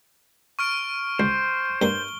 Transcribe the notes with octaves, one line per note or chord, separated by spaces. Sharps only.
C#6 F6 D7
C#2 C5
G2 A#3 G7